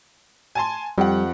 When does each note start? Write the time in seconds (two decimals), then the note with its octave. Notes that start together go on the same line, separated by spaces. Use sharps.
0.55 G#5 A5 C6
0.98 F2 G3 G4 F#5